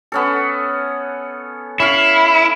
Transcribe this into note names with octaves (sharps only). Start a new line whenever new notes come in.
B3 C#4 A4
C#4 E4 F5